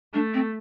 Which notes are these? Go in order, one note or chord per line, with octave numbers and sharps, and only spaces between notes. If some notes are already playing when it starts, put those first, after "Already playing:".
A3 D4
C4